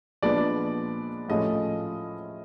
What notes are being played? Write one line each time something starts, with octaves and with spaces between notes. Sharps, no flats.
A#2 F3 G#3 B3 D4 D5
A2 F3 G#3 C#4 F4 D#5